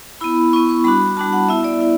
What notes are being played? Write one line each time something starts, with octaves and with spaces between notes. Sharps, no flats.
B3 E4 B5
B3 E4 C#6
C#6
G3 D4 F#4 B5
G3 D4 F#4 A5
F#5
B3 E4 E5
D5
E4